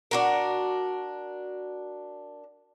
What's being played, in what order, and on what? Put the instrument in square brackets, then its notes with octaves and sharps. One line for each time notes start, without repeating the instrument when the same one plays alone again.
[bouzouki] D4 F#4 A#4